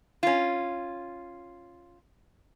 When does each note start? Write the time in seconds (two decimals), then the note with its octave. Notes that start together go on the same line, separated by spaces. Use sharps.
0.23 C#4 F4